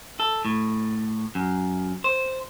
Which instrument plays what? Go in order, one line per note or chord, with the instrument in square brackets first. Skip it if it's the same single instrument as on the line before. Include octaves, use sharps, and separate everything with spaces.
[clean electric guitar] A4
A2
F#2
C5